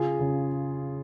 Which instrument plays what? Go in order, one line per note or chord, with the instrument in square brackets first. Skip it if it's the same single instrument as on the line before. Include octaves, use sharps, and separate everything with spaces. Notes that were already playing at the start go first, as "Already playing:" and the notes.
Already playing: [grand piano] C#3 F4 G#4
C#3